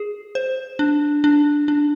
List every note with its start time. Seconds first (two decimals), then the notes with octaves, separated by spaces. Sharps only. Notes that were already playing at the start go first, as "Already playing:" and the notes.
Already playing: G#4
0.35 C5
0.79 D4
1.24 D4
1.68 D4